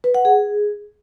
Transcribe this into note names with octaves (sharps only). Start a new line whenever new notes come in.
B4
F#5
G#4